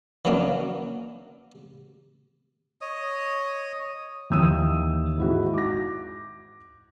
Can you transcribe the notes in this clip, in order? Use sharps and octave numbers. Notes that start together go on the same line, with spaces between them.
E3 F#3 A#3 C#4 D4
C#5 D#5 D#6
D#2 E3 D#6 E6 D#7
G#2 E4 F#4
D6 A#6